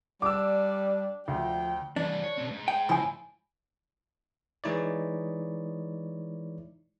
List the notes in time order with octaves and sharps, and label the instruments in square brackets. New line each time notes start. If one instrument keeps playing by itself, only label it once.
[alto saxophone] G3 [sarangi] D4 [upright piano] D6 E6
[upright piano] D2 [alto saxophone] F3 [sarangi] G5
[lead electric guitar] E3 G3 [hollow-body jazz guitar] D4
[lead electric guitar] C#5
B2 C4
G#2
[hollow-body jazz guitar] G5
[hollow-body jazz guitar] C#3 F3 E4 [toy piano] G#5 B5
[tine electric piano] E3 G#3 D#4 E4 C#5 D5